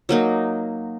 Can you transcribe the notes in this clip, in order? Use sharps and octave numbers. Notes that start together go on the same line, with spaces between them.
F#3 A#3 D#4